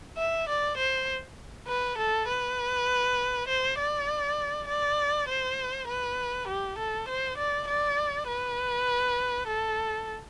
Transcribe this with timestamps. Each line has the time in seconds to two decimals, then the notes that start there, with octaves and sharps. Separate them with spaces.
0.18 E5
0.49 D5
0.78 C5
1.68 B4
1.98 A4
2.28 B4
3.48 C5
3.79 D5
4.68 D5
5.28 C5
5.88 B4
6.48 G4
6.79 A4
7.08 C5
7.38 D5
7.68 D5
8.28 B4
9.47 A4